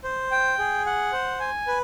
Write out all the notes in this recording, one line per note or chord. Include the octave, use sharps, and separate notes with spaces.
C5
G5
G#4
F#5
C5
G#5
B4